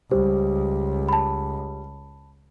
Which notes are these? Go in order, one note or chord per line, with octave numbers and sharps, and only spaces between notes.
C#2 G3 C5
A5 B5